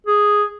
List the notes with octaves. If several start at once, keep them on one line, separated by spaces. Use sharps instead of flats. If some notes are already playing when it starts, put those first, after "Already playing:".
G#4